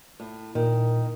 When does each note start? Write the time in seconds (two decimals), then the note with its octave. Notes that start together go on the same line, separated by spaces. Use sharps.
0.20 A2
0.55 A#2 D#3